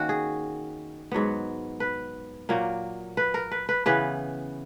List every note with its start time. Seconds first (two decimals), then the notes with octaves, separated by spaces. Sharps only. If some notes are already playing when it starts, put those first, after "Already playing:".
Already playing: D#3 A#3 C#4 F#4
0.09 G#4
1.12 G#2 F#3 B3
1.80 B4
2.49 A#2 F#3 A#3
3.17 B4
3.34 A#4
3.51 B4
3.69 B4
3.86 C#3 E3 B3 B4